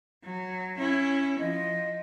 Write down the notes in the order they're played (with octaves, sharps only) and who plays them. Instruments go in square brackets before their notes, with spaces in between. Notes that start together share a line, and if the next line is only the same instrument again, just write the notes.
[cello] F#3
C#4 E4
[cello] F3 [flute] D#5